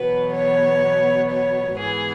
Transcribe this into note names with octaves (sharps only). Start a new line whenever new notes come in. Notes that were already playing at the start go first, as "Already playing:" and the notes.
Already playing: E2 B2 F#3 B3 B4
C#5
C#5
G#2 E3 B3 G#4